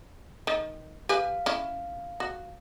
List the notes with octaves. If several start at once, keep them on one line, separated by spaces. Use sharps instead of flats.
D#3
G4 B4 F5 G#5
C#4 E4
F#4